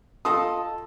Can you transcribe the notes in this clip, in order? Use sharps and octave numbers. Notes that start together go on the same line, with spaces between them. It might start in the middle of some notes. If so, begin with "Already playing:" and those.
F4 A4 D#5 D#6